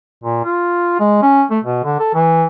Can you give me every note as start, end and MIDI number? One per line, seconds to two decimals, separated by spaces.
0.24 0.39 46
0.44 0.95 65
1.00 1.20 56
1.22 1.44 61
1.51 1.59 57
1.64 1.82 47
1.84 1.97 50
1.99 2.14 69
2.14 2.45 52